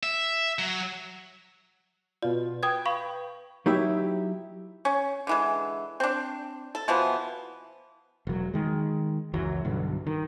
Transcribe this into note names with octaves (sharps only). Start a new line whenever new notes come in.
E5
F#3
B2 F4 D5
B4 G5 D#6 G#6
F5 B5 C#6
F#3 D#4 E4 G4 E5
C#4
D3 E3 G#3
C4 D4
A4
B2 E3 F3 B3
E1 F#3
D#3 G#3
C#2 F#2 E3 F#3
B1 G2 D3
D#3